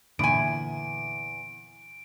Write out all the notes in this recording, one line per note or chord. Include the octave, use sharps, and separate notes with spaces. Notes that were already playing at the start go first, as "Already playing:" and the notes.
E2 A#2 D3 G#5 D7